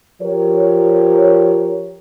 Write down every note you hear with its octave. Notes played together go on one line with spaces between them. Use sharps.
F3 G4 A#4 C#5